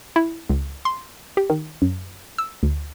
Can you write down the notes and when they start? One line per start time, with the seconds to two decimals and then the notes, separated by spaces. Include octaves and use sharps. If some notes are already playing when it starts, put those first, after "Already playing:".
0.16 E4
0.49 C#2
0.85 C6
1.37 G4
1.50 D#3
1.82 F#2
2.38 E6
2.63 D2